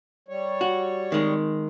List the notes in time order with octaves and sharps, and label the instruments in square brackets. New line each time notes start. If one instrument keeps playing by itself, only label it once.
[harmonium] G3 C#5
[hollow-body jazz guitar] F#4
D#3 G#3